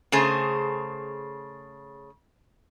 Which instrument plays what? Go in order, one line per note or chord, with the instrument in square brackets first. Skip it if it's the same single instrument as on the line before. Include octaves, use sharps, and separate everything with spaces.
[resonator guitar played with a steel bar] C#3 A3 G#4 C5